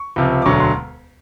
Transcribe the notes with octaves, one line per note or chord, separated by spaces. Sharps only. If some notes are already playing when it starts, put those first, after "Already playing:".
Already playing: C#6
C#2 C3 F3
D6
E1 D2 D3 F#3 C#6
C6